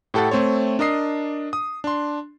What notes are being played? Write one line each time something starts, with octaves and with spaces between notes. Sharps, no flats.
A2 G4 A4 F#5 A6
A3 C4 C5 C#5
D4 A#4 D#5 D#6 C7
D#6
D4 C6